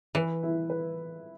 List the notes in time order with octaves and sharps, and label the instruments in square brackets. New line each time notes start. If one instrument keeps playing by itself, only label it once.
[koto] E3 [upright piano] B4
[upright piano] E4
B4